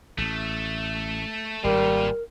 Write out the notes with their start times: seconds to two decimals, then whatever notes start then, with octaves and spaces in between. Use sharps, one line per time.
0.18 A1 A3
1.64 G#1 A#2 G3 F4 A#4